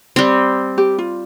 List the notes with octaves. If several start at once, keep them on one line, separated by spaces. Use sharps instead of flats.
G3 C4
G4
F4